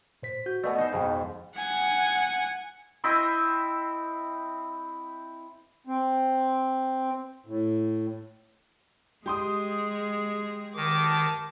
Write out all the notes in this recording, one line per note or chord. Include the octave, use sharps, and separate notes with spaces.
A#2 C5 B6
F#4 G6
B2 A3 D5 D#5 G#5
D#4 C5
F2 G#2 B2 D#5
F#5 G#5
C4 E4 D#5 E5
C4
A2
G#3 G4 G#4 C6 D#6
D#3 A5 D6